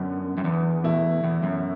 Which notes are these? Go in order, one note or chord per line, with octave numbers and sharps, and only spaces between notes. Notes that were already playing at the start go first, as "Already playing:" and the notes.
Already playing: F#2 D3 B3
F#2
E2
B2 A3 E4
E2
F#2